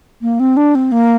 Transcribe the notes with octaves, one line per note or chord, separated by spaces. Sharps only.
A#3
C4
D4
C4
A#3